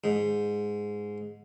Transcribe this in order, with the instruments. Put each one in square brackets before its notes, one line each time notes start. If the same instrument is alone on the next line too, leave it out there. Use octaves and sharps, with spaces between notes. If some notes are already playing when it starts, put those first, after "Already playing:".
[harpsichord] G#2